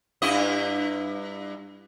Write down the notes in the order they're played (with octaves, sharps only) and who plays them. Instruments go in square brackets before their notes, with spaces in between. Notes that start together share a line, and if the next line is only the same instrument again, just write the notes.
[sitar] G2 E4 D#5